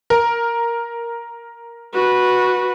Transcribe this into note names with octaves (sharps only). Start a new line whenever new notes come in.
A#4
F#4 B4